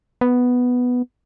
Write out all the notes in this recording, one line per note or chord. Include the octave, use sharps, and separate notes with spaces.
B3